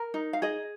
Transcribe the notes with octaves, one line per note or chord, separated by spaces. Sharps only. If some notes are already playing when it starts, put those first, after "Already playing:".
Already playing: A#4
D#4
F5
G#4 D#5